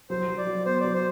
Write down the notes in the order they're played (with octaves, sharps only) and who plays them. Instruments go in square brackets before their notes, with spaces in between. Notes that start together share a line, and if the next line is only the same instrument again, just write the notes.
[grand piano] F#3 [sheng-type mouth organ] C5
[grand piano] F#3
[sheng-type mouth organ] D5
[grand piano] F#3
[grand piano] B3 [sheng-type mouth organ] C5
[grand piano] F#3 [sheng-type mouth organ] D5
[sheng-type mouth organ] C5